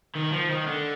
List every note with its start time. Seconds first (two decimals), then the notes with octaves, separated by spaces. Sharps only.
0.16 D#3
0.33 F3
0.50 D#3
0.68 D3